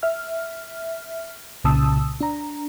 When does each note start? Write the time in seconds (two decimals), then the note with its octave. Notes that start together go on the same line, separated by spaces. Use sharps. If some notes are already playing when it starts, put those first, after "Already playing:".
0.03 E5 F6
1.64 C2 A#2 C#3 A5 D#6 E6
2.21 D4 A#5